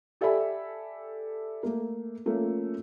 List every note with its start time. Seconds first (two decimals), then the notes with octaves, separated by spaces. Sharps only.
0.21 G4 A4 D5 E5 G#5 B5
1.63 A3 A#3
2.26 F3 A3 A#3 C#4